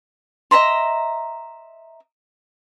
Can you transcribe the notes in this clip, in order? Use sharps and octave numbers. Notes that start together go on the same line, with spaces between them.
D#5 E5 A#5 C6